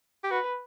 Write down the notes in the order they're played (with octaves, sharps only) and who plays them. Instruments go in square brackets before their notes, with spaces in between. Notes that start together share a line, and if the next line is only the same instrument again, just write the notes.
[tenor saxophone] G4
[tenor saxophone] F#4 [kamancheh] B4